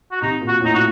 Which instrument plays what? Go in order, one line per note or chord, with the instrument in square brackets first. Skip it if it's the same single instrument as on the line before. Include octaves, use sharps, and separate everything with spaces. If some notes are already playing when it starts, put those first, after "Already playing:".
[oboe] F#4
[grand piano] C3 [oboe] D#4
[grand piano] A#2
[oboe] F#4
[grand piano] A2
[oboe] D#4
F#4